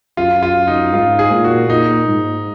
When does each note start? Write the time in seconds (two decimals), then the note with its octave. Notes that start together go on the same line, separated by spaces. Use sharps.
0.17 F#2 F4
0.43 F4
0.67 D#4
0.93 G#2 F4
1.19 G#4
1.31 A#2
1.44 F#4
1.69 A#2 D#4
2.07 G#2